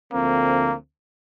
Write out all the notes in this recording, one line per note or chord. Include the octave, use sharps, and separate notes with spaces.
D2 D3 F3 A3 A#3 C4